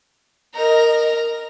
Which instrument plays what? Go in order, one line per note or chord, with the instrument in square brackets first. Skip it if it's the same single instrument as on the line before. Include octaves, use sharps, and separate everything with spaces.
[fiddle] A#4 A#5 [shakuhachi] D#5